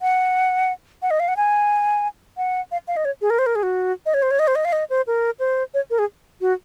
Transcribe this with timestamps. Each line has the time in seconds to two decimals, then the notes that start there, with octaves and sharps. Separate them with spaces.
0.02 F#5
1.02 F#5
1.11 D#5
1.20 F5
1.28 F#5
1.37 G#5
2.37 F#5
2.71 F5
2.88 F5
2.97 D#5
3.05 C#5
3.21 G#4
3.30 A#4
3.39 C5
3.46 A#4
3.55 G#4
3.63 F#4
4.06 D#5
4.14 C#5
4.23 C5
4.31 C#5
4.39 D#5
4.48 C5
4.55 D#5
4.65 F5
4.72 D#5
4.90 C5
5.07 A#4
5.40 C5
5.74 C#5
5.90 A#4
5.99 G#4
6.41 F#4